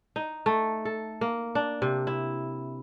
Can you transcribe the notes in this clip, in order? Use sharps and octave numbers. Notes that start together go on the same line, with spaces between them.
D#4
A3
A4
A#3
D4
C3
E4